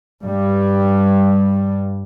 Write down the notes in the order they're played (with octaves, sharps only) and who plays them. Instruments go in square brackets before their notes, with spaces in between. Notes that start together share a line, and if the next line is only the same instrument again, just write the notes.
[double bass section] G2 G3